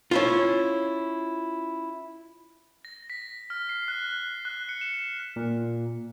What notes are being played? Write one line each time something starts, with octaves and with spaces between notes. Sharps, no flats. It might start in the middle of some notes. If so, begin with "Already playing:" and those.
C#4 E4 F4
A#6
B6
F6
C7
F#6
F#6
C#7
E7
A#2